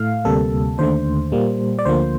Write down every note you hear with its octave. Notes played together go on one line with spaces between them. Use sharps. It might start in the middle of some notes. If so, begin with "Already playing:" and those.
Already playing: A2 A3 F5
D2 C3 G3 A#3 A4
D#2 D3 A3 C5
A#2 G3 A#3
D5
D2 D3 F3 A#3 C5